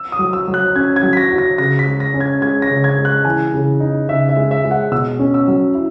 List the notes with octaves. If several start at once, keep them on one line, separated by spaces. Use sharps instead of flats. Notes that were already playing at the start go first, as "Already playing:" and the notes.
Already playing: E6
D#6
F#3
E6
F#3
F#6
C#4 G#6
G#6
F#3
B6
A#6
F#4
A#6
C#3 A#6
B6
G#3
A#6
C#4
G#6
G#3 G#6
A#6
C#3
G#6
G#3
F#6
E3 G#5
C#3
D#4
C#3 E5
E5
G#3
E5
G#3
F#5
B2 E6
C#4
E6
F#3
E4